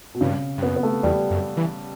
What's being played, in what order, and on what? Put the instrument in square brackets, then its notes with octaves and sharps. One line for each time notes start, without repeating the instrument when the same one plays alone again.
[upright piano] B2
[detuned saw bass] G2 [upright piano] C#3
[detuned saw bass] G2
[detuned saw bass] F#2 [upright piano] B3
[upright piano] B3
A3
[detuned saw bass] E2 [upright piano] G3
[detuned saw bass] F#2
E3